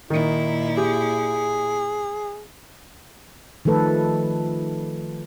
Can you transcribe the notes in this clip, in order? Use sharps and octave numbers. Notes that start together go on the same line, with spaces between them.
A#2 D#3 D#4 E4
G4 G#4
D#3 F3 A3 A4 B4